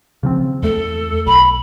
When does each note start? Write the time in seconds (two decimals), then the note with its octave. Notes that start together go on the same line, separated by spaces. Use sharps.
0.23 C#3 F3 C4
0.63 E2 A3 A4
1.26 B1 B5